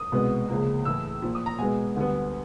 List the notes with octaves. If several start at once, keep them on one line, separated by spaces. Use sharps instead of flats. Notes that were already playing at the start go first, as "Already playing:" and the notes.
Already playing: D#6
C2 B2 G#3 B3
C#2 C#3 F3 A#3
A2 E3 A3 E6
A#2 F3 A#3
D#6
A#5
B2 G#3 B3 G#5
D2 D3 G3 B3